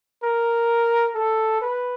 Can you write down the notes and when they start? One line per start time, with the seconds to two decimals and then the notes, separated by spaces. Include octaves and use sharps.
0.23 A#4
1.15 A4
1.61 B4